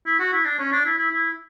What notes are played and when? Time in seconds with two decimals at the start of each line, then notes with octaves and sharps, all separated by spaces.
0.06 E4
0.19 F#4
0.33 E4
0.45 D4
0.59 C#4
0.72 D4
0.85 E4
0.98 E4
1.11 E4